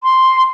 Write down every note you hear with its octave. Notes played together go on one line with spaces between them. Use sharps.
C6